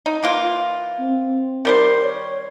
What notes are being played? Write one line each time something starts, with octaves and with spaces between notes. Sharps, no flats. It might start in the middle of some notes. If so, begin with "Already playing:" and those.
D#4
E3 A#3 F4
C4
D#3 G3 A#4 C5
C#5